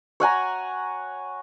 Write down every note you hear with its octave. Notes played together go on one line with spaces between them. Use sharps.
C#5 F#5 G#5 A#5